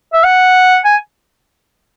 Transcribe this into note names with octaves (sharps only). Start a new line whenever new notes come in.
E5
F#5
G#5